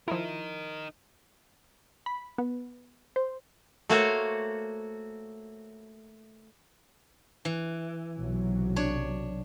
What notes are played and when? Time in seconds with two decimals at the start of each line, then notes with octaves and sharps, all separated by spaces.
0.08 F3 D#4 E4 A#4
2.06 B5
2.38 B3
3.16 C5
3.90 A3 A#3 F#4 C5 C#5 F5
7.45 E3
8.17 B1 C3 F#3
8.76 D4 C#5